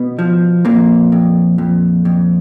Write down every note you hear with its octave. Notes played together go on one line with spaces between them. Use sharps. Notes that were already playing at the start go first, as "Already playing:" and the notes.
Already playing: B2 B3
F3
F2 A#2 A#3
F2
F2
F2